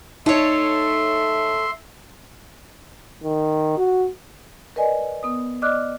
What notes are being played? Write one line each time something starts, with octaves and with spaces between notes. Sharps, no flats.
A3 D#4 C#5 E5 C6
D#3
F#4
A#4 B4 D5 D#5 G#5
B3 D#6
D5 D#5 D6 F6 F#6